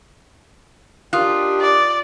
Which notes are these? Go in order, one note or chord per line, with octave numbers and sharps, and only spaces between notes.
D4 D#4 F4 G4 A#4 D#6 F#6
D5